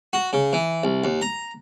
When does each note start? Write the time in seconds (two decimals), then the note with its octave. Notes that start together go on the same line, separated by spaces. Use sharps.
0.13 F#4
0.33 C#3
0.53 E3
0.84 C2
1.04 D#2
1.22 A#5